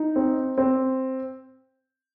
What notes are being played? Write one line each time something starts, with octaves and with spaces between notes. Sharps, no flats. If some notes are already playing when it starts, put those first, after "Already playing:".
Already playing: D#4
C4
C4